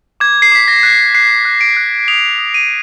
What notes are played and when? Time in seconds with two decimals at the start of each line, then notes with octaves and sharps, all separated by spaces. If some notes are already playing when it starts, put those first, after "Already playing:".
0.20 D6 G#6
0.42 C7
0.52 D6 B6
0.68 A#6
0.83 F#6
1.14 F#6 C7
1.45 F#6
1.61 D7
1.77 F#6
2.08 D#6 F7
2.38 D#6
2.54 D#7